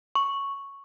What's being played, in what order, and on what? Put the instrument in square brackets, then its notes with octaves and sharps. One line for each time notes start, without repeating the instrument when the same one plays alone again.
[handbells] C#6